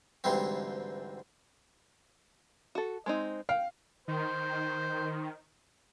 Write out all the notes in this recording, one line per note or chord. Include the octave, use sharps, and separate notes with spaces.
D2 G#2 E3 G3 C4
F#4 A4
G#3 C4 D#4
F5 G5
D#3 C5